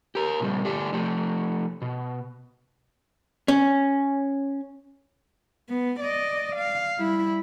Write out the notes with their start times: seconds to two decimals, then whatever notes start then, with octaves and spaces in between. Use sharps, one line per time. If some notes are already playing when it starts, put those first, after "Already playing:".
0.15 G4 A#4
0.40 A#2 C#3 E3 G3
0.65 D3 A3 D4 G4
0.93 F3 A3
1.82 B2
3.48 C#4
5.69 B3
6.00 D5 D#5
6.56 F5
6.99 G3 E4